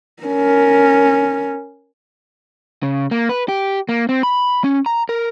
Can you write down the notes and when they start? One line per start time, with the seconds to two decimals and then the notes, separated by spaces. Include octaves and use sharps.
0.23 C#4 A#4
2.83 C#3
3.11 A#3
3.29 B4
3.48 G4
3.89 A#3
4.09 C4
4.23 B5
4.64 C#4
4.86 A#5
5.09 A#4